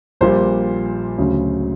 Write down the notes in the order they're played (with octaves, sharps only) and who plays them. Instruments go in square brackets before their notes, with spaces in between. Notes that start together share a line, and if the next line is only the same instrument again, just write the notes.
[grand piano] A#1 A#2 G3 C5
D2 C#3 F#3